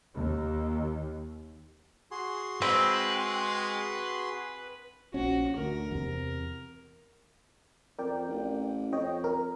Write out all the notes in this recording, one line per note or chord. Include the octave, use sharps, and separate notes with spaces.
D#2
F#4 G#4 C6
G#3 C4 B4
A#1 F3 C#4 F#4
D2 A#4
E2 C3
F2 A#4 D5 G5
A1
F2 C#5 D#5 G5
A#4